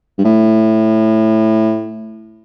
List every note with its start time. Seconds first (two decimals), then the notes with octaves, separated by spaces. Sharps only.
0.18 G2
0.24 A2